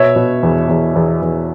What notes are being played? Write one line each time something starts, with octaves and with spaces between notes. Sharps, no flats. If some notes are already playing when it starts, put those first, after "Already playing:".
Already playing: B2 C#5 E5
B2
E2
E2
E2
E2